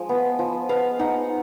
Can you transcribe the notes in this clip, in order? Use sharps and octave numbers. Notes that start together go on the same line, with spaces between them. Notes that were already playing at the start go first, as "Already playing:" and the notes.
Already playing: F3 G#3
B3
F3
B3 F5
D#4 F#5